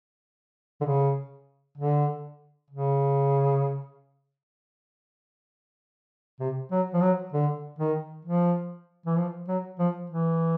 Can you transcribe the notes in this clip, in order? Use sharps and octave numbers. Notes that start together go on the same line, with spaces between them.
D3
C#3
D3
C#3
C3
F#3
F3
F#3
D3
D#3
F3
E3
F3
F#3
F3
E3